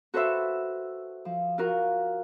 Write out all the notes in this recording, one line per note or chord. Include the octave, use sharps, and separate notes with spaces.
F#4 A4 B4 C5 E5
F3
F4 F#4 A#4